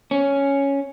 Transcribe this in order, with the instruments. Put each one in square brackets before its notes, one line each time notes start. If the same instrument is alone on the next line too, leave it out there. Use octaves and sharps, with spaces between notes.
[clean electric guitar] C#4